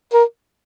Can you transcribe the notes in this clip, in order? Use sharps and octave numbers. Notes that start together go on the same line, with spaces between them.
A#4